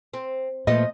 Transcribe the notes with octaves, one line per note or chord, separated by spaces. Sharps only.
C4
A#2 F3 A3 B3 D#5